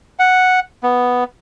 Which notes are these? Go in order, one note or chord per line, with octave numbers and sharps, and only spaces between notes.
F#5
B3